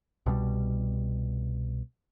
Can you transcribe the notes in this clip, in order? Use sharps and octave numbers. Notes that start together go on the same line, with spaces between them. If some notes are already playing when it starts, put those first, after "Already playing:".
C2 B2 D3 G3